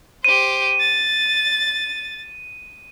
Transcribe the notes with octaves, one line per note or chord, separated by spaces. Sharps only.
G4 C5 D#7
A6